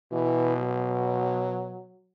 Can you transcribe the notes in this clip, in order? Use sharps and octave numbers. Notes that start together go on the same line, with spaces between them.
B2 E3
F#3